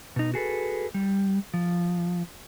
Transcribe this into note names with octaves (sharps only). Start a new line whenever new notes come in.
B2 D#4
F#4 G#4 A4 B4
G3
F3